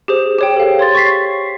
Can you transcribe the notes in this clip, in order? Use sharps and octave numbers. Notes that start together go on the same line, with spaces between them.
G4 G#4 C5
G4 C#5 G5
A4 F5
C#5 C6 A6
C#6 A6 B6 C7